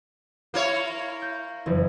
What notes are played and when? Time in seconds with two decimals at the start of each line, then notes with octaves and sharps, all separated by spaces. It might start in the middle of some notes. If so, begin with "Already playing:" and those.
0.54 A#3 E4 C#5
1.22 G6
1.66 F#1 F2 E3